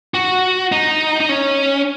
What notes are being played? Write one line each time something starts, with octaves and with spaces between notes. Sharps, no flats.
F#4
D#4
D#4
C#4